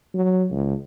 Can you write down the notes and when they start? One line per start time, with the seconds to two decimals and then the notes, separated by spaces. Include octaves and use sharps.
0.14 F#3
0.51 C#2